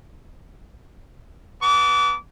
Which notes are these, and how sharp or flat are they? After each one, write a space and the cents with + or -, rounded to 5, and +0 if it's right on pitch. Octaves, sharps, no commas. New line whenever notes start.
B3 +0 A5 +30 D6 -30